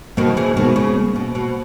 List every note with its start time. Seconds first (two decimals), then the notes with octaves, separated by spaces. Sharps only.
0.17 B2 D#3 G3 A#3
0.37 C#3 E3
0.56 B2 D#3 G#3 B3
0.76 C#3
0.89 B3
0.96 G3 A#3
1.16 B2
1.35 B2